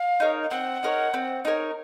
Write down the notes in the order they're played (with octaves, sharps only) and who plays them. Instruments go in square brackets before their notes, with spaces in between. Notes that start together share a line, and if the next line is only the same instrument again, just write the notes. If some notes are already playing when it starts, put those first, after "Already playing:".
Already playing: [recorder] F5
[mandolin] D#4 A#4 C#5
[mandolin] C4 [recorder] F#5
[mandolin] D#4 A#4 C#5
C4
D#4 A#4 C#5